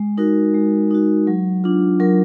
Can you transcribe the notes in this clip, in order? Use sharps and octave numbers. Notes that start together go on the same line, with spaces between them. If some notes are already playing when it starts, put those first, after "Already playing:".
Already playing: G#3
D#4 F#4 A#4
G#3
D#4 F#4
F#3
D4 F4
F#3 A#4